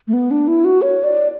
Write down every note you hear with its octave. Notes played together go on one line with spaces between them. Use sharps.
A3
B3
D4
E4
F#4
C#5
D5